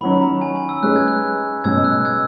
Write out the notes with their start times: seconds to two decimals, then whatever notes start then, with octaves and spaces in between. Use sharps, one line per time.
0.01 D#3 F#3 C#4 B5
0.22 A#5
0.41 G#5
0.56 G#5
0.69 E6
0.83 G#3 C#4 G#4 B4 F#6
0.96 G#6
1.08 F#6
1.64 B2 G#3 C#4 E6 G#6
1.84 F#6
2.05 E6 G#6